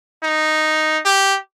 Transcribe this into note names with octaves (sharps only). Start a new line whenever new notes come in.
D#4
G4